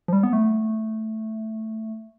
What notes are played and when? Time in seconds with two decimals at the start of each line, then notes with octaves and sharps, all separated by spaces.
0.08 F3
0.13 G3
0.23 B3
0.33 A3